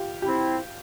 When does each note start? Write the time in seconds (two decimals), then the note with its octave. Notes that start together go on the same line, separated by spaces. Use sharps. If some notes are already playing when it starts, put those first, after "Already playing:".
Already playing: F4 G4
0.22 C4 E4 G4